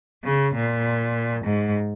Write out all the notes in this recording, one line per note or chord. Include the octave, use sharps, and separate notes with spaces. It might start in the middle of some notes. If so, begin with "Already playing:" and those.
C#3
A#2
G#2